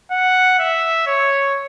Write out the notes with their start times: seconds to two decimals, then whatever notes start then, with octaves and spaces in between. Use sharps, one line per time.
0.12 F#5
0.59 E5
1.07 C#5